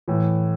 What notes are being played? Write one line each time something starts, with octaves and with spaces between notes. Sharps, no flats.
A2 E3